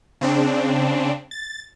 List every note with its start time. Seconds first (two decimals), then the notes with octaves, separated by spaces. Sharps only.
0.21 C#3 C4 D4
1.31 A6